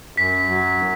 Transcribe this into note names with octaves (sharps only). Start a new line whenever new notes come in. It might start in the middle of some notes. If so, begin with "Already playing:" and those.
F#2 B6
F#3